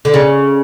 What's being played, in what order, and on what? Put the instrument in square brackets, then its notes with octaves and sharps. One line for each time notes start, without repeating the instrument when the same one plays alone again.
[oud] D3
C#3